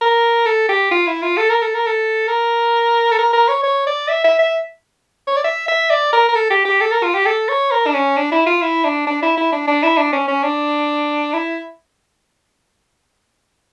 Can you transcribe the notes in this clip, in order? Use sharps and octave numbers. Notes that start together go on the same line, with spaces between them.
A#4
A4
G4
F4
E4
F4
A4
A#4
A4
A#4
A4
A#4
A4
A#4
A#4
C#5
C#5
D5
E5
E5
E5
C#5
D5
E5
E5
D5
A#4
A#4
A4
G4
G4
A4
A#4
F4
G4
A4
C#5
A#4
D4
C#4
D4
E4
F4
E4
D4
D4
E4
E4
D4
D4
E4
D4
C#4
C#4
D4
E4